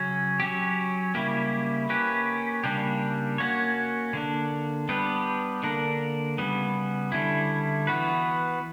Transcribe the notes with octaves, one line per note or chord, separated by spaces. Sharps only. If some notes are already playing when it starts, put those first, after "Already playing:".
Already playing: C#3 F#3 C#4
F#3 C#4 G4
C#3 G3 A#3 E4 G4
A#3 C#4 G4 B4
C#3 G3 A#3 D4 G4
A#3 C#4 F#4 C#5
D3 A#3 D4
G3 B3 D4 G4 B4
D3 A#3 D4 A#4
C#3 G3 B3
D3 G3 C#4 E4
E3 B3 F#4 B4